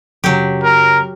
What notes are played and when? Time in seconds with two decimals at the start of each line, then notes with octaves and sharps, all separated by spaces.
0.24 F#2 C#3 F#3 G4
0.63 A#4